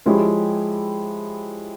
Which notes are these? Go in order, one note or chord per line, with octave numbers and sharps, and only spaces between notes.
F3 G#3 E4 G4 C#5